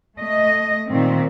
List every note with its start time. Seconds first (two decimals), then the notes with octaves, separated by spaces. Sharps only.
0.17 A3 D#5
0.87 A#2 D#3 C4